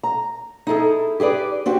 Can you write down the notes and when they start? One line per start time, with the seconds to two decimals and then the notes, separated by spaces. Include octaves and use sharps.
0.03 A#5
0.67 D#4 E4 G#4 A4
1.20 G4 G#4 B4 D5
1.66 C4 D4 F#4 G4